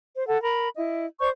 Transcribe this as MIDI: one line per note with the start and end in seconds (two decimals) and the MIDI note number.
0.15 0.27 72
0.27 0.40 69
0.27 0.40 78
0.43 0.68 70
0.43 0.68 83
0.77 1.06 64
0.77 1.06 75
1.20 1.28 72
1.20 1.28 74
1.20 1.28 85
1.20 1.28 91